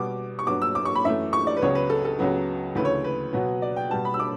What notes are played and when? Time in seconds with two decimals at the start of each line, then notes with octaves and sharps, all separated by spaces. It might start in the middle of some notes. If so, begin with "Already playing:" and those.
Already playing: B2 G3 B3 D6
0.39 C#6
0.47 G2 F#3 B3 D6
0.62 E6
0.75 D6
0.85 C#6
0.95 B5
1.04 F#2 E3 A3 E5
1.33 C#6
1.47 D5
1.57 B4
1.61 C#2 C#3 F#3 B3 C#5
1.75 B4
1.90 A4
2.05 A4
2.19 C#2 C#3 F#3 B3
2.75 D2 C#3 E3 A3 B4
2.85 C#5
3.04 B4
3.33 B2 F#3 B3
3.62 D5
3.76 G5
3.90 B2 G3 B3 A5
4.05 B5
4.14 E6
4.19 D6